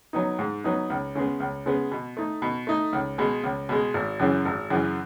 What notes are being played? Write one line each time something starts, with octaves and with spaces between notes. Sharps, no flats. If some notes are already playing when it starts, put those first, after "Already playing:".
F#3 B3 D#4
G#2
F#3 B3 D#4
C#2
C#3 G#3 B3
C#2
C#3 G#3 B3
B2
A3 D#4
B2
A3 D#4
C#2
B2 G#3
C#2
B2 G#3
G#1
F#2 C#3 E3
G#1
F#2 C#3 E3